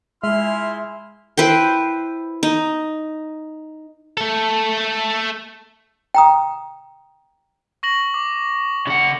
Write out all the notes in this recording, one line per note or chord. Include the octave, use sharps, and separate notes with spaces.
G#3 E4 F4 G#4 E5 C6 F6
E4 B4 C5 G5
D#4
A3 A4
G5 A#5 D#6
C#6 A#6 F#7
D6
C#3 F#5